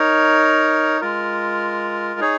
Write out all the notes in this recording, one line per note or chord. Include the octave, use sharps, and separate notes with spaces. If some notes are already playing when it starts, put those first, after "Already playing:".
Already playing: D#4 A#4 C#5
G#3 F4 A#4
D#4 G#4 C#5